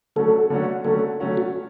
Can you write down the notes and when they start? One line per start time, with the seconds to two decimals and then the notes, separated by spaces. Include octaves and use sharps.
0.16 D3 F#3 A3 C#4 F#4 A4
0.50 D3 F#3 A3 C#4 F#4
0.85 D3 F#3 A3 C#4 F#4 A4
1.20 D3 F#3 A3 C#4 F#4
1.37 F#4